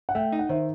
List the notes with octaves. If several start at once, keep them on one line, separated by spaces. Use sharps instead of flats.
F#5
A3 E5 G5
D#4
F#5
D#3 C5 E5